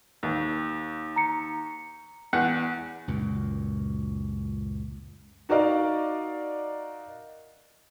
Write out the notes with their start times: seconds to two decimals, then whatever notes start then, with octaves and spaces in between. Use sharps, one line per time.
0.23 D#2
1.16 A#5 C#7
2.33 E2 F#5
3.08 C#2 F#2 A#2
5.49 D#4 F#4 A#4 D5 D#5 F5